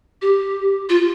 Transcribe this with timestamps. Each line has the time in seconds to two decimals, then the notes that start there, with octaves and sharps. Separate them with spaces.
0.22 G4
0.89 F4